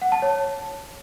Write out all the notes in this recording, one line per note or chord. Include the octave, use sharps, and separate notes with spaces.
F#5
A5
C#5